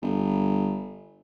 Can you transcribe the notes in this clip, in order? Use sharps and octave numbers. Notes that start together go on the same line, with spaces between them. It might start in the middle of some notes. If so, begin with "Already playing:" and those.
G1